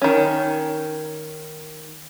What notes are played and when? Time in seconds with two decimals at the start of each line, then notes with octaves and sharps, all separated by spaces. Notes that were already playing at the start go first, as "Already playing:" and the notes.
0.02 D#3 C#4